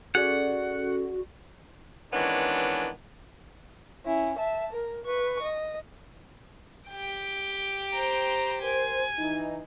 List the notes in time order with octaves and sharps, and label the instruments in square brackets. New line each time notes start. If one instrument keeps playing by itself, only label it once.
[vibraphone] C#4 A4 [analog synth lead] F#4 [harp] G#4 D5 [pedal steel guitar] F#5
[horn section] D#3 E3 G#3 B3 C#4 D4
[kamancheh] C#4 E4
E5 A5
A#4
B4 C#6
D#5
[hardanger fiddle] G4 G5
[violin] C5 A#5
[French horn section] A#4 C5 [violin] G#5
[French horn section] E3 D#4